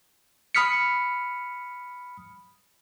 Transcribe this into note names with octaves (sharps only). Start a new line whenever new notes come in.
B5 D#6 F6 B6 C#7